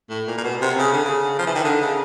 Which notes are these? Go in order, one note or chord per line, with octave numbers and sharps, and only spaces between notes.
A2
A#2
A#2
B2
C3
C#3
D3
C#3
F3
E3
D#3
D3
C#3